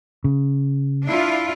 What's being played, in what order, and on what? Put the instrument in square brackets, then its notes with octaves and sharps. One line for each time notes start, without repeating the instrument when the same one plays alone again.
[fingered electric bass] C#3
[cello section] D4 E4 F4